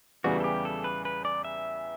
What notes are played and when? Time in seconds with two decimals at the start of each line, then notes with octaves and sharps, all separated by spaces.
0.24 E2 C#3 E3 G3 B3 F#4
0.40 A4
0.44 G4
0.65 A4
0.84 B4
1.05 B4
1.25 D5
1.44 E5